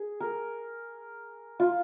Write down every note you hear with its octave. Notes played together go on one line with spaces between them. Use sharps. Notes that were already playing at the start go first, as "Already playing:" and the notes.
Already playing: G#4
A#4
F4